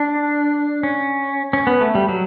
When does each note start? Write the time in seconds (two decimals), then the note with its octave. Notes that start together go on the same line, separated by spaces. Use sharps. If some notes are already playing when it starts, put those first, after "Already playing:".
Already playing: D4
0.83 C#4
1.53 C#4
1.67 B3
1.81 A3
1.95 G3
2.09 F#3